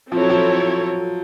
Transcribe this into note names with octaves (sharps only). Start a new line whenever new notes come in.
F3 C4 E4 A4 C#5
F#3
F3